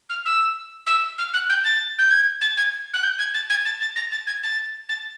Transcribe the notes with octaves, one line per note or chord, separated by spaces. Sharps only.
F6
E6
E6
F6
F#6
G6
A6
G6
G#6
A6
G#6
F#6
G6
G#6
A6
G#6
A6
A6
A#6
A6
G#6
A6
A6